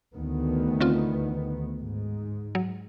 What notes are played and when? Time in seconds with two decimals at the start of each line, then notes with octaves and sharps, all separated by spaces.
0.17 D2 D#3 B3
0.80 D3 C4 F4
1.80 G#2
2.55 F#3